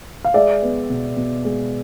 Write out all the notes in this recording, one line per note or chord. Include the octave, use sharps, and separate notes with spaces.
F5
G#3 D5 E5
B3
B2
B2
G#3